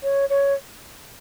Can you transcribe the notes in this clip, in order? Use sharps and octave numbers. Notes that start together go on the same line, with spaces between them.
C#5
C#5